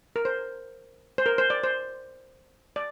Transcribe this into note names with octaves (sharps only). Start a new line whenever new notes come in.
A#4
C5
C5
A#4
C5
D5
C5
D5